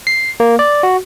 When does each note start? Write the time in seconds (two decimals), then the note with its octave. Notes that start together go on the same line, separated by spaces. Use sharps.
0.07 C7
0.40 A#3
0.59 D5
0.83 F#4